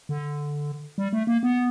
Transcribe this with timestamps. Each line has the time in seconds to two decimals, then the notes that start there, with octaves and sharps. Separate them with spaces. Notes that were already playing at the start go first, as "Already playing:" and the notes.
0.09 D3
0.98 G3
1.13 A3
1.27 A#3
1.43 B3